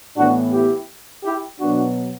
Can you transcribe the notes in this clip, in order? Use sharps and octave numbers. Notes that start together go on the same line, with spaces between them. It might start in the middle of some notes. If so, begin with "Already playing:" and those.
A2 E3 B3 D4 F#4
E4 G4
E4 G4
B2 F#3 B3 D4 F#4